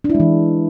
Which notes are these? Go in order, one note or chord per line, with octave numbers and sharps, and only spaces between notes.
D4
E4
G#3
E3